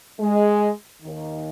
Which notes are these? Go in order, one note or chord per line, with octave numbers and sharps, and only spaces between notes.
G#3
D#2 D#3